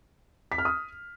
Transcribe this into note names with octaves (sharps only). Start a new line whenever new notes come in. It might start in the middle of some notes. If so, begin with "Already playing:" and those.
B6
F6
D#6